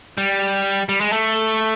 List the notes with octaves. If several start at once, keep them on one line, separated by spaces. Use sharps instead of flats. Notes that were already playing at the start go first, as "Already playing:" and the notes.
G3
G3
G#3
A3